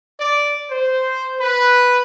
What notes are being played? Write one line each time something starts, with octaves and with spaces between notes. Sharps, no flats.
D5
C5
B4